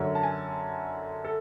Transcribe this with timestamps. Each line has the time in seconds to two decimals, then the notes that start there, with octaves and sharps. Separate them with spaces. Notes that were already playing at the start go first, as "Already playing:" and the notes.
Already playing: F#2 D3 C#5
0.15 A5
0.23 G#5
1.25 A4